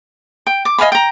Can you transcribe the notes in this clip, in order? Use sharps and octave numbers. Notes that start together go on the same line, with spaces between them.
G5
D6
D#5 F5 G#5 B5
G5 A#5